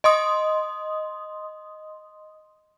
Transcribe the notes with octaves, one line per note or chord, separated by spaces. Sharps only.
D#5 C6 D#6